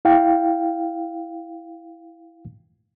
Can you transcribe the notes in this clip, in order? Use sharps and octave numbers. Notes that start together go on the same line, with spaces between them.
E4 F5 G5